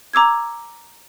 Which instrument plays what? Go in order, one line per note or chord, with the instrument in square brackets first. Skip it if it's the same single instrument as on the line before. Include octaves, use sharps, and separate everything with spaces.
[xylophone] A#5 D6 E6 G#6